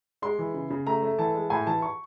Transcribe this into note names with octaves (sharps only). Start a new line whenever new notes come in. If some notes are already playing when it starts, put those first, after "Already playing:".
G#3 C6
E3
C#3
C#3
A3 A#5
A3
E3 A5
G#3
A2 G#5
E3 A5
C#6